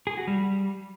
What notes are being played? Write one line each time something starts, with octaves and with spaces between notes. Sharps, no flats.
G#4
F#4
G3